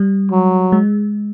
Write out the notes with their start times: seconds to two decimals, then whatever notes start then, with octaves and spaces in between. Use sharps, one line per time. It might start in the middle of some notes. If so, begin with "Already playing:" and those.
Already playing: G3
0.31 F#3
0.72 G#3